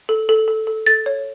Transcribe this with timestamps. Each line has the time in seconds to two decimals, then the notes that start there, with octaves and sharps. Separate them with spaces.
0.09 A4
0.29 A4
0.48 A4
0.67 A4
0.87 A4 A6
1.06 C#5